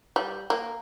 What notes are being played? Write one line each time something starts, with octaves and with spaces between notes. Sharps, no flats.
G3
A#3